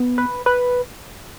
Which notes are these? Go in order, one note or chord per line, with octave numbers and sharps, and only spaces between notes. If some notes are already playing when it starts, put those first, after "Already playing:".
Already playing: B3
B4
B4